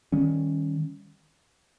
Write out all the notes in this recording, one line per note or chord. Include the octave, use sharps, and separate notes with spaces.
D#3 G3 C#4